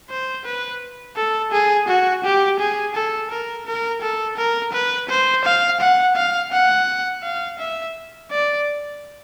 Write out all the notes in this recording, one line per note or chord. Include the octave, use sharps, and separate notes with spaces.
C5
B4
A4
G#4
F#4
G4
G#4
A4
A#4
A#4
A4
A#4
B4
C5
F5
F#5
F5
F#5
F5
E5
D5